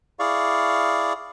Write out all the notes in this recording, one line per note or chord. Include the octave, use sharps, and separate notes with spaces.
E4 G#4 D5 F5 C#6